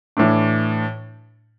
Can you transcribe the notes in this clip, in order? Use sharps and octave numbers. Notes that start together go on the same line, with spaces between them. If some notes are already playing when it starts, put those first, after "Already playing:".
A2 E3 A3 D4